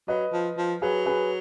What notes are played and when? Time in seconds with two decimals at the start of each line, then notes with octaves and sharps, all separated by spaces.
0.08 F#3 B4 D#5
0.33 F3
0.58 F3
0.82 F#3 G#4 B4
1.06 G#4 B4